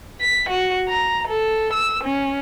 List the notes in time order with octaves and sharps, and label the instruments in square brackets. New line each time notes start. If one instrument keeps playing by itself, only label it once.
[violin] B6
F#4
A#5
A4
E6
C#4